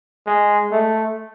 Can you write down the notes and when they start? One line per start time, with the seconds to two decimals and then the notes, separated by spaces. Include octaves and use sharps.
0.26 G#3
0.72 A3